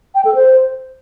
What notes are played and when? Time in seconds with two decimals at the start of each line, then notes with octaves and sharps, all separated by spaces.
0.15 G5
0.25 A4
0.35 C5